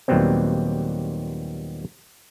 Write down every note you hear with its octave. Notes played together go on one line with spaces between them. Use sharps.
D#2 A#2 F#3 G3 B3 C4